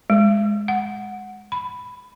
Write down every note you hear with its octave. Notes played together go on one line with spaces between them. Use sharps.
G#3
F#5
B5